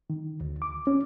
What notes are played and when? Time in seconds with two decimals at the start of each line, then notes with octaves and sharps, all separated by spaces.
0.10 D#3
0.41 D2
0.62 D6
0.87 C#4